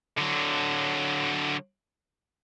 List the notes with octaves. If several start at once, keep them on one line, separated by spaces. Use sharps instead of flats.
D3 F#3